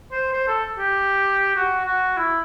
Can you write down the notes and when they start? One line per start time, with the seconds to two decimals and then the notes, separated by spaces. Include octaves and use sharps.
0.12 C5
0.32 C5
0.47 A4
0.78 G4
1.56 F#4
1.85 F#4
2.17 E4